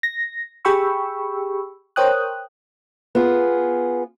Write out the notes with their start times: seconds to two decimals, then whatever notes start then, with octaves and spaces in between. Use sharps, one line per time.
0.03 A#6
0.65 G4 G#4 G5 B5 C#6 E6
1.96 A#4 C5 C#5 G5 D#6 F#6
3.15 B3 F4 G#4